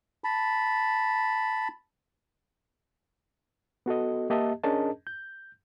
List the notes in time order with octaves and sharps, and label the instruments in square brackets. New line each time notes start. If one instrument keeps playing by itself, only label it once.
[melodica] A5 B5
[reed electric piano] B3 F#4 A4 D#5
A#3 G4 D#5 E5 A5
C#4 D4 G#4 A#4 D#5 A5
G6